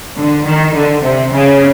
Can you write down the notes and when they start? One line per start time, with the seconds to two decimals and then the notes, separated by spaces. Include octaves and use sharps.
0.18 D3
0.46 D#3
0.75 D3
1.03 C3
1.32 C#3